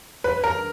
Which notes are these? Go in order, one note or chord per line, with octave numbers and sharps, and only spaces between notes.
B4
A#4